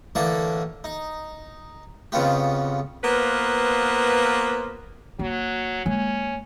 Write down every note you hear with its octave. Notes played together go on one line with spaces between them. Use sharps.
A2 D3 E3 A#3 D5 D6
D#4
F2 C#3 B3 F4 G4
A#3 B3 F4 B4 C5
F#3 A#3
G#3 A#3 C#4